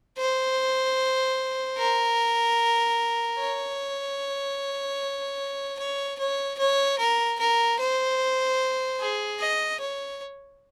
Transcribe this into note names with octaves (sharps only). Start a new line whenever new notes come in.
C5
A#4
C#5
C#5
C#5
C#5
A#4
A#4
C5
G#4
D#5
C#5